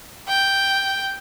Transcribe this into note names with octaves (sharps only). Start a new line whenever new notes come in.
G5